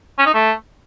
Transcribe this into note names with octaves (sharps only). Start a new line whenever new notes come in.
C#4
D#4
A3